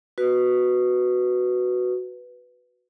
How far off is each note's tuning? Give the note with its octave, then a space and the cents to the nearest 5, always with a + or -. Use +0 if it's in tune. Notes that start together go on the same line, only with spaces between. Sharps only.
F#4 +0 B4 +0